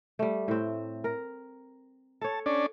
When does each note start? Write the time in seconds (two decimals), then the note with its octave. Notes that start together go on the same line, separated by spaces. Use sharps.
0.19 G3 A3
0.48 A2 C4
1.04 A#4
2.21 A4 C#5 A5
2.46 C#4 D4 D5